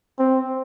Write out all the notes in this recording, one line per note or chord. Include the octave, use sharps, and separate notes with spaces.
C4